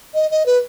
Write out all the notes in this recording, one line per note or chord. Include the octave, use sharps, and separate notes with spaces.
D#5
D#5
B4